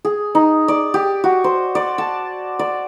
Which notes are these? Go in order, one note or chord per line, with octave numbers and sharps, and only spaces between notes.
G#4
D#4
D5
G4
F#4
C5
D5
A5
D5